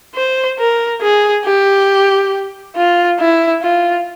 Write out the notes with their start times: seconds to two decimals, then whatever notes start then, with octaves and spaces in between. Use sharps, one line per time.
0.15 C5
0.59 A#4
1.02 G#4
1.45 G4
2.76 F4
3.19 E4
3.63 F4